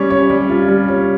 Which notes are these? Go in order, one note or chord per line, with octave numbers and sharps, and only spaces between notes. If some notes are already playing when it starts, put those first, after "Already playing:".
Already playing: G3 C#4 C#5
C#5
G3
F4
G3
C#5